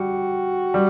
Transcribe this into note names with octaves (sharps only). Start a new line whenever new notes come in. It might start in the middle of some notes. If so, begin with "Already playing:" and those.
Already playing: G3 F#4
G3